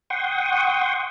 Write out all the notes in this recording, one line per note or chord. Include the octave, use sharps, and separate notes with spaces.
F#5 G5 C6 C#6 D#6